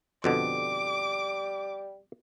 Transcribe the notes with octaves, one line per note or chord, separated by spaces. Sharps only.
F2 B2 D3 G3 D6